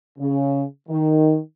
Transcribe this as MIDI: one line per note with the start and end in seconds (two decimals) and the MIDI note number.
0.18 0.62 49
0.89 1.37 51